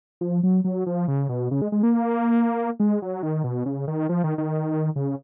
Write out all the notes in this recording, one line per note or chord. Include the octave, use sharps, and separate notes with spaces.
F3
F#3
F#3
F3
C#3
B2
C#3
G#3
G#3
A#3
G#3
F#3
D#3
B2
C#3
D#3
F3
D#3
D#3
C#3